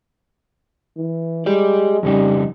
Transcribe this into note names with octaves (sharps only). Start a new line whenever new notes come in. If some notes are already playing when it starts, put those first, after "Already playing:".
E3
G#3 G4 D5
F2 C#3 G3 D#4